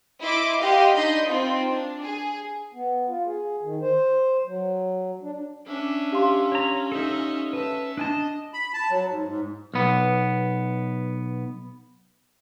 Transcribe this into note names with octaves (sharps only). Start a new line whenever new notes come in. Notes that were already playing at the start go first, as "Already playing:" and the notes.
E4 D#5 C6 D6
G4 D#5 F5 F#5 C6
D4 D#4 D#5 B5 C6 G6
C4 D#4 F4
D4
G#4
B3
F4
G#4
D#3
C5
F#3
D4
C#4 D4 E5
G4 F5 C6
C#5 A#5
D#4 A4 D#5 E5
B4 E5 A5
D4 D#5 G#5 A5
B5
A5
F#3
G#2
G#2
B1 B3